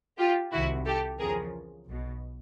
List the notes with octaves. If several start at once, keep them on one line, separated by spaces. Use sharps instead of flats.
F4 G4
C2 C3 D#3 E4 F#4
G4 A4
E2 C#3 F3 G#4 A#4
B1 B2